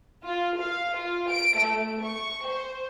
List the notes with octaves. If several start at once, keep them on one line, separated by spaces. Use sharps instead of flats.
F4
F5
F4
D7
A3
C#6
C5